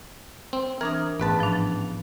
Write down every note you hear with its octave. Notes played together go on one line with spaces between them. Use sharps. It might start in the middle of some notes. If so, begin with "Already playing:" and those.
C4
E3 D4 A#4 D#6
A1 G#2 B3 B4 A5
F3 D4